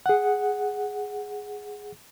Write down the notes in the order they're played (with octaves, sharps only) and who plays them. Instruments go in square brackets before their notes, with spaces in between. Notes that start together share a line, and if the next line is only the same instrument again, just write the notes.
[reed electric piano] G#4 F#5